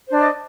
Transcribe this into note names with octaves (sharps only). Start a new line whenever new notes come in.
D4 C5 D5 D#5